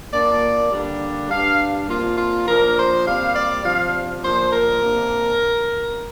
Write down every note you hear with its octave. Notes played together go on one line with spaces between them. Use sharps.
A#2 A#3 D4 D5
D3 G3 A#3 D4
G2 G3 D4 F5
C3 A#3 D4 F4
F4
A#2 F3 D4 A#4
C5
A#2 G3 C4 F5
D5
C3 F3 D4 F5
A#2 F3 D4 C5
A#4
C3 A#3 D4